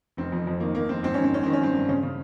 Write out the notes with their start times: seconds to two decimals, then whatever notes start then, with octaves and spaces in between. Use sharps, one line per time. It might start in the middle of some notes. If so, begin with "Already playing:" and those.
0.17 F1 C4
0.32 F2
0.47 F2
0.60 D#3 A#3
0.74 F1 A#3
0.89 F1 C4
1.03 G#1 C4
1.14 G#1 C#4
1.24 C4
1.32 G#1 C#4
1.43 D#3 C4
1.53 C#4
1.61 G2 C4
1.74 G2
1.89 C#3 C#4
2.03 C#3